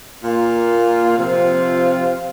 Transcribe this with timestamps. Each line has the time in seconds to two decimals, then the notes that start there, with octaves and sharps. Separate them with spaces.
0.22 A#2 A#3 F4
1.17 C3 F3 C4 F4